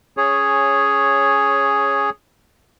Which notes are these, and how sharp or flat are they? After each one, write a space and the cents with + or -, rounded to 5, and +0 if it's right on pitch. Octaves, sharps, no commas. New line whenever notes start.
C#4 -10 G#4 +0 C#5 +0